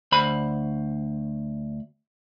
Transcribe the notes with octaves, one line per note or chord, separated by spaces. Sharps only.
D2 C5 B5